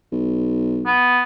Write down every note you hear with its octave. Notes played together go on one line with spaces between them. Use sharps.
B1
B3